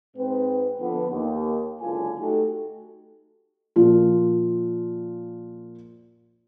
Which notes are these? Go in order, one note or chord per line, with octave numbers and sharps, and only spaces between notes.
G#2 C4 B4
D3 F3 B3
D#2
F#1 C#2 D3 F4 G#5
A3 D#4 F#4 G4 A4
A#2 F3 F4